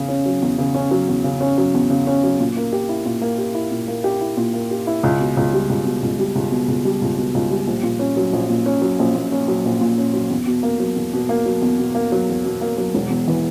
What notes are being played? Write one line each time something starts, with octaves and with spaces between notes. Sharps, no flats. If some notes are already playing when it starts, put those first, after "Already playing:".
Already playing: E2 C#3
C#4
F#3
E2
C#3
C#4
F#3
E2
C#3
C#4
F#3
E2
C#3
C#4
F#3
A#2
A#3
G4
E4
A#2
A#3
G4
E4
A#2
A#3
G4
E4
A#2
A#3
G4
E4
C#2
B2
C#2
G3
C#2
B2
C#2
G3
C#2
B2
C#2
G3
C#2
B2
C#2
G3
A#1
A#2
C#4
F#3
A#1
A#2
C#4
F#3
A#1
A#2
C#4
F#3
A#1
A#2
C#4
F#3
E2
B2
A#3
F#3
E2
B2
A#3
F#3
E2
B2
A#3
F#3
E2
B2
A#3
F#3
E1
E2
E3